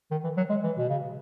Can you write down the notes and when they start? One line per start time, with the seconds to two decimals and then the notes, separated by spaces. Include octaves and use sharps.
0.11 D#3
0.24 E3
0.37 F#3
0.49 G#3
0.63 E3
0.78 B2
0.89 C#3